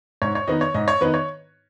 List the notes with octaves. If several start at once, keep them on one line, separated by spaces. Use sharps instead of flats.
G#2 C#5
C#5
D#3 B3 D#4 D#5
C#5
G#2 D#5
C#5
D#3 B3 D#4 B4
C#5